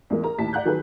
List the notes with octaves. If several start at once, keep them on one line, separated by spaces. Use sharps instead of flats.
E2 G#3 A#4
A#4 A#5
D#2 A2 A5 B6
D5 F#5 A#5 F#6 G6
D#3 F#3 G#4 A4 B4